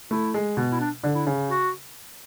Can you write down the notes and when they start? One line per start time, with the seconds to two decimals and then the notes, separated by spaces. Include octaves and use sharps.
0.11 A3 E4
0.34 G#3
0.57 B2
0.72 E4
0.80 D4
1.04 D3
1.15 E4
1.27 C#3
1.50 F#4